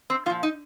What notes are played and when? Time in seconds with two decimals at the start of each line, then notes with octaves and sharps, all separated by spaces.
0.10 C4
0.26 A#2 F4
0.30 F3
0.43 D#4